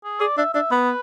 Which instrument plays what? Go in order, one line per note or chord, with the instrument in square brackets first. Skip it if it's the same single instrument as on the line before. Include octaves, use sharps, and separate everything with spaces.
[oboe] G#4
[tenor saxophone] G#4 [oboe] D5
[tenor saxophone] D4 [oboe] E5
[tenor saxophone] D4 [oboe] E5
[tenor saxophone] B3 [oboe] B4